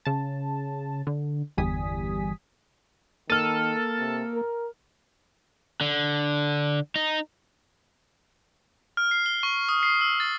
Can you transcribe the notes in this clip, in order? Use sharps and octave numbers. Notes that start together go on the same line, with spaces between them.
C#3 A5
D3
G1 E2 G3 G#5 D#6 B6
D#3 A#3 A4 F6 D#7
C3
A#4
D3
D#4
F6
C7
G7
C#6
D#6
C7
E6
A6